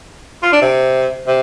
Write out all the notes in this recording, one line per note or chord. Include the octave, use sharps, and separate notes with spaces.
F4
D4
C3
C3